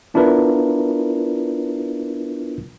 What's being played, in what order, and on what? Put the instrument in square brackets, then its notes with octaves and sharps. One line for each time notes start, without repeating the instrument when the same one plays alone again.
[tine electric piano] B3 D4 E4 F4 A#4 B4